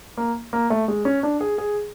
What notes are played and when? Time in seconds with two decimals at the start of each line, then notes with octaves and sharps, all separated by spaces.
0.17 A#3
0.53 A#3
0.70 A3
0.88 G#3
1.05 C#4
1.23 D4
1.41 G#4
1.58 G#4